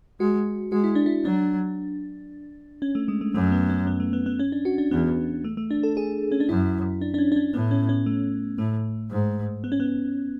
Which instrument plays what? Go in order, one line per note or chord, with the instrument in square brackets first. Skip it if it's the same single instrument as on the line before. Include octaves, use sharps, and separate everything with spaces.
[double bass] G#3 [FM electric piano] F#4
[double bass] G#3 [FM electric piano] F#4
[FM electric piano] E4
D4
E4
[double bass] F#3 [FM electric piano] D4
[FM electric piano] C#4
A3
G#3
A3
[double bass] F#2 [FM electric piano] A3
[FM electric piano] B3
C#4
B3
A3
B3
B3
C#4
D4
F#4
D4
[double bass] E2 [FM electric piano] B3
[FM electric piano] A3
A3
D4
A4
G#4
C#4
D4
[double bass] F#2 [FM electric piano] E4
[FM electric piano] D4
D4
C#4
D4
C#4
[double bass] A2 [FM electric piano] B3
[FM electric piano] C#4
C#4
A3
[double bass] A2 [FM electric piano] A3
[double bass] G#2
[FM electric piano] B3
C#4
B3